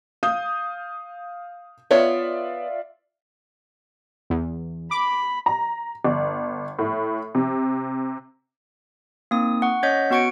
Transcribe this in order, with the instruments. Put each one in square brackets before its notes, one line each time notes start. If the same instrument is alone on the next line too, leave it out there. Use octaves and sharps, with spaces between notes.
[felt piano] F5 D#6 G6
[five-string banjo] B3 C#5 [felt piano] F4 D5 E5
[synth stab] E2
[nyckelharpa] B5 [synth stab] D6
[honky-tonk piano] A#5
G1
A2
C3
[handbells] A#3 C4 D#4 D#6
F#5 C#6
C#4 C#5 D#5 F#5 G6 B6
B3 F#4 F#5 C#6 C#7 D7